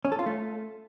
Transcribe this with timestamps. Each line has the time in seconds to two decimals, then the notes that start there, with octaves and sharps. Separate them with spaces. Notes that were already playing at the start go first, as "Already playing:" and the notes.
0.05 C#4
0.12 A4
0.19 F4
0.26 A3